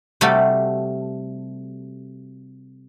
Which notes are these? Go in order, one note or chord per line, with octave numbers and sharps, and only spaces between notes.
C3 G3 A3 F#4 A4